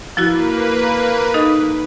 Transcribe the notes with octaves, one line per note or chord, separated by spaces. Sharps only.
F3 A#3 E4 F#4 B4
D#4 A4 D#5